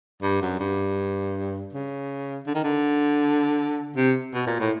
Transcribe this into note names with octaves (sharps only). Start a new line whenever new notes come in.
G2
F#2
G2
C#3
D3
D#3
D3
C3
B2
A#2
A2